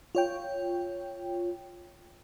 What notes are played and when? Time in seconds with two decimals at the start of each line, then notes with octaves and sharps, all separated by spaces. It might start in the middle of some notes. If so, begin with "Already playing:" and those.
0.15 F4 C#5 G5